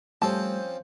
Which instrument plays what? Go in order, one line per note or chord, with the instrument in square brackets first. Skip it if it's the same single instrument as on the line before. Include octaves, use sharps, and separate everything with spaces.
[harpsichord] F3 C4 C#4 [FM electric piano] G3 A3 [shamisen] A5